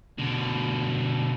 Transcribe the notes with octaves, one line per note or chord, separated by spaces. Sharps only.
B2 D3